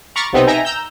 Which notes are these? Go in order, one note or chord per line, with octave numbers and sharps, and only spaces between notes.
A#5 B5 C#6 D6 F6 A6
B1 C3 B3 C4 D#4
D#4 E5 G5 G#5 A#5 A#6
A#5 E6 G6